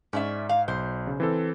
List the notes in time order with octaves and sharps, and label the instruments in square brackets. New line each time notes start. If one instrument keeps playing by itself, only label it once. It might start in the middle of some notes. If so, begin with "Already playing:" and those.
[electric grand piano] G#2 [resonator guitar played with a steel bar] C#4 D5 E5
[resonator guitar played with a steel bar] F5
[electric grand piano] B1 [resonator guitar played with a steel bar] C5
[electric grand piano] C#3
E3 C4 A4